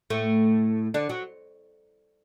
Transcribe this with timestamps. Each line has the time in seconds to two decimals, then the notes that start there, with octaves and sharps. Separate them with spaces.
0.10 A2 A3
0.94 D3 D4
1.09 F#3